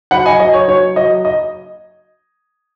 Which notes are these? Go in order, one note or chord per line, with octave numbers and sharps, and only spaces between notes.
F#3 F#5 B5
D#5 G#5
F#3 D#5
C#5
F#3 C#5
F#3 D#5
D#5